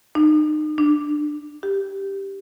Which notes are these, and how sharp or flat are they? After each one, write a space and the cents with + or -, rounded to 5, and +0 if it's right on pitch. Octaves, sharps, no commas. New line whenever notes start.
D#4 -30
D4 +20
G4 +0